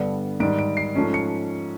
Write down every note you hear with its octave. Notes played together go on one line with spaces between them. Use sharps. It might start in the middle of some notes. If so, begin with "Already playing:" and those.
Already playing: G2 D3 G3 B3 D4 C#7
G#2 D#3 G3 D7
D7
C7
G#2 F3 A3 C#4
C#7